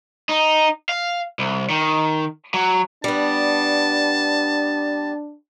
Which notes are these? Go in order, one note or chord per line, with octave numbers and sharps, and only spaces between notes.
D#4
F5
C2
D#3
F#3
G3 B3 D4 A5